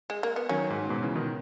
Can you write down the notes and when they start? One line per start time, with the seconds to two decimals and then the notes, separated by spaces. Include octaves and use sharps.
0.10 G#3
0.23 A#3
0.36 B3
0.49 D#3 F#3 C#4
0.70 G#2
0.89 G#2 B2
1.03 C#3 E3
1.15 B2 D#3